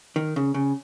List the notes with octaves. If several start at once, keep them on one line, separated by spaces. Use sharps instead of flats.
D#3
C#3
C#3